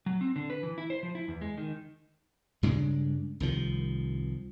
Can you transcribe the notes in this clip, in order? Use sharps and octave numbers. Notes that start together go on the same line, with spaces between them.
F#3
C4
D3
B4
E3
E4
C5
F3
E4
E2
G#3
D#3
G2 C#3 G#3 D4
C2 D#3 F3